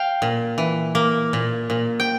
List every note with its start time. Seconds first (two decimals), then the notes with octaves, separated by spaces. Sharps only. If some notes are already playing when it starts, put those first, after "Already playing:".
Already playing: F5 G5
0.22 A#2
0.58 E3
0.95 A#3
1.33 A#2
1.70 A#2
2.00 G5